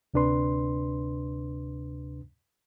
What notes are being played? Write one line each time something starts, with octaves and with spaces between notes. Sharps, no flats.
D2 C3 D4 B4 C6